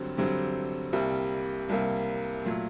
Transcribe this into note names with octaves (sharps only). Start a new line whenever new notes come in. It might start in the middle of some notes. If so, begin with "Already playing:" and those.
Already playing: G2 D3 F#3 C4 G4
G2 D3 F#3 C4 G4
C2 C3 G3 A#3
C2 C3 G3 A#3
A#2 F#3 A3